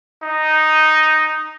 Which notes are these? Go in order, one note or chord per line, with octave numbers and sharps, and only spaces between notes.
D#4